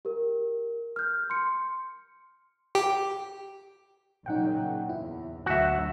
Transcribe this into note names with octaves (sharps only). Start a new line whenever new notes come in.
G4 A#4
F6 G6
C6 C#7
G4
A#2 C#3 F#3 D#4 F#5 G5
E2 E4
D2 F#3 A3 F#4 E5 F#6